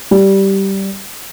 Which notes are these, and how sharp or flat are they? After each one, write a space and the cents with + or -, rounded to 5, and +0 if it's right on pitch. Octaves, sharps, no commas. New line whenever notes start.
G3 -10